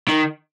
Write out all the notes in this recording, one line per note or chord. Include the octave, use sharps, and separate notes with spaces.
D#3